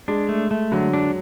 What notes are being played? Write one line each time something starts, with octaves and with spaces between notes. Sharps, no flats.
G#3 D4
A3
A3
D3 F#3
D4